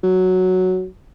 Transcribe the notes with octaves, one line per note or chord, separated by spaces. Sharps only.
F#3